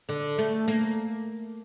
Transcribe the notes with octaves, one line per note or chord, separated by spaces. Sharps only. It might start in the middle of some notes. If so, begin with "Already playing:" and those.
D3
A3
A#3